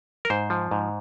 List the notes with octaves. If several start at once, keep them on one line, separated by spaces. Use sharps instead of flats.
A#4
G#2 C5
F3
G#2